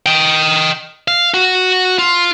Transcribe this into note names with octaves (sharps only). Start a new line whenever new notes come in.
D#5 G5
F5
F#4
F4